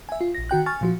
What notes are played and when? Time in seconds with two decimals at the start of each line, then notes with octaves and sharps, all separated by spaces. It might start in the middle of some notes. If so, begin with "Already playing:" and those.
0.09 E5 G#5
0.21 F4
0.35 A#1 A#6
0.49 D#3 F#4 G5 F#6
0.66 G#5 C#6 F6 A6
0.81 A#2 F3 F#4